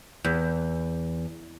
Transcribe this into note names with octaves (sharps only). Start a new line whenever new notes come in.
E2